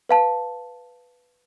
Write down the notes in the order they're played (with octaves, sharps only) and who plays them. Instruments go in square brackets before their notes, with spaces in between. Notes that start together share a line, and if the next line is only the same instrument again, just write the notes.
[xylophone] B4 F5 A5